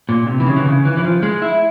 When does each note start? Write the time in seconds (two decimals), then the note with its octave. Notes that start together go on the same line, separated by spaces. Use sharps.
0.09 A#2
0.27 C3
0.40 E3
0.46 C#3
0.56 E3
0.66 C#3
0.85 E3
0.97 E3
1.04 F3
1.23 G#3
1.42 E4